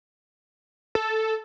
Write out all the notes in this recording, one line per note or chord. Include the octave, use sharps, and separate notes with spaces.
A4